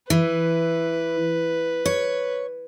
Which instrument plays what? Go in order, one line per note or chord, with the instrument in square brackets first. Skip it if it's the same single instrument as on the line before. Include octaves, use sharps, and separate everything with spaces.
[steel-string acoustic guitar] E3 [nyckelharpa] B4
[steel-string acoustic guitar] C#5